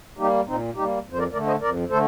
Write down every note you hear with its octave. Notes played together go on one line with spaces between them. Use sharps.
G3 A#3 D#4 G4
A#2 C4 D#4
G3 A#3 D#4 G4
F2
C5
A#4 D5
D3 A3 A#4 D5
C5 D#5
F2 A#4 D5
D3 A3 A4 C5